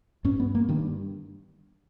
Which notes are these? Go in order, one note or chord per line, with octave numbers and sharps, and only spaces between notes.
G2 C#4
B3
A#3
G2 D#3